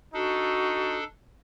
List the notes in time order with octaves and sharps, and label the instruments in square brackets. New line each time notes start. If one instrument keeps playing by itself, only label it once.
[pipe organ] D4 A4 [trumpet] D#4 [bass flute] F#4